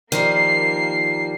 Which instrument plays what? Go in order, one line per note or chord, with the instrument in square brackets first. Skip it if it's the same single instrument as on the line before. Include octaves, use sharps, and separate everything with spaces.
[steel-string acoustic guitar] D#3 F3 G3 [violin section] A#3 C7